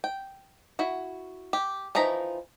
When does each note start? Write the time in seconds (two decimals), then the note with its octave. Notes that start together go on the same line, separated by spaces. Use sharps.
0.04 G5
0.79 E4 F#4
1.53 G4
1.95 E3 F3 D#4 A#5 B5